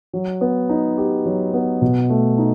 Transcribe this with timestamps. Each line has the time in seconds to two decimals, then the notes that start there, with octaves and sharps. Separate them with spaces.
0.13 F#3
0.41 B3
0.69 D#4
0.97 G4
1.26 F#3
1.54 B3
1.82 B2
2.09 A3
2.38 D#4